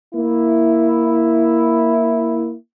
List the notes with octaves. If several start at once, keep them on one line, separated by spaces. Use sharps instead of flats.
A#3 E4